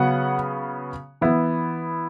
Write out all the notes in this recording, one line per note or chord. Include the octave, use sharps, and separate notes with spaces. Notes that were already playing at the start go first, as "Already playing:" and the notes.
Already playing: C#3 F#3 B3 F#5
E3 B3 E4